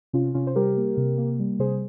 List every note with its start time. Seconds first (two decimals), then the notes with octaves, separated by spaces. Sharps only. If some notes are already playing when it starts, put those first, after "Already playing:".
0.13 C3 C#4 F4
0.34 C3 C#4 F4
0.47 C5
0.56 G3 G4 A#4
0.77 A#3
0.97 C3
1.18 A#3
1.40 G3
1.59 C3 G#4 C5